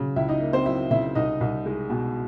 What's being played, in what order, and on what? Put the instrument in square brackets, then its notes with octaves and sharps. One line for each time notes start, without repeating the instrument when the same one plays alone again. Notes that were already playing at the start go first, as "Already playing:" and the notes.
Already playing: [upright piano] C#3 F#3
C#2 E4 E5
D#4 D#5
A#3
C4 C5
F#3 E4 E5
C#3 E4 E5
C2 D#4 D#5
C2
G#3
B2